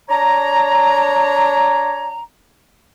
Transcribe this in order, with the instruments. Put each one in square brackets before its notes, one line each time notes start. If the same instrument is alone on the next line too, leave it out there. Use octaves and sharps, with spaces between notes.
[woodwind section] D4 C#5 A#5